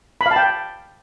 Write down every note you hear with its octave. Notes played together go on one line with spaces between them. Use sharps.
B5
F5
A5
G5